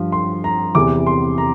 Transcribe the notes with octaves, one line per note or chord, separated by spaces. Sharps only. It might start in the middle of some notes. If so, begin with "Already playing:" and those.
Already playing: G2 F3
C6
A#5
E2 C3 E3 D6
C6
A#5